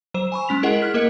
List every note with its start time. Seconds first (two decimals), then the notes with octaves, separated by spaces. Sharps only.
0.14 F#3 C5 E7
0.32 G#5 B5 C#6
0.48 G#3 C#4 B6 F7
0.63 E4 G#4 A#4 D#5 F#5
0.81 F6 F#6 B6
0.94 A#3 A#4 D#5 C#7